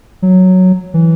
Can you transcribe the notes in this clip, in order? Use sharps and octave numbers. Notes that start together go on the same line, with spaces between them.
F#3
E3